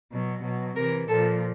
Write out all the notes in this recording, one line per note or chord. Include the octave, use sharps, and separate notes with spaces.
B2 F#3
B2 F#3
C3 E3 A#4
A#2 F3 A4